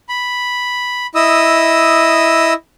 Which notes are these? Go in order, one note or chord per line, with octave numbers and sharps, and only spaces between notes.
B5
E4 D#5 D#6 E6